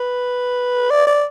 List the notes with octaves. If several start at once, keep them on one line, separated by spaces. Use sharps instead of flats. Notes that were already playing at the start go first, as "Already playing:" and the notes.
Already playing: B4
D5
D5